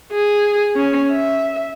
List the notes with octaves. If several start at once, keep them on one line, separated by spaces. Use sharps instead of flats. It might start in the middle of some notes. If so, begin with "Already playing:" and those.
G#4
C#4
E5